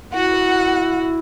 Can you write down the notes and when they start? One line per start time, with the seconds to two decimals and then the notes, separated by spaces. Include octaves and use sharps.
0.12 E4 F#4 F#5